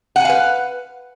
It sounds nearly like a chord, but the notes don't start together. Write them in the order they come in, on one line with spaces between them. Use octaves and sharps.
F#5 G#5 F5 B4